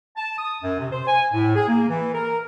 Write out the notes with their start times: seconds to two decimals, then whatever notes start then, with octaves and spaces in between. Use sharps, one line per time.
0.17 A5
0.38 D#6
0.62 F#2
0.79 C3
0.92 C5
1.07 G#5
1.32 A2
1.55 G#4
1.68 A#3
1.88 E3
2.14 A#4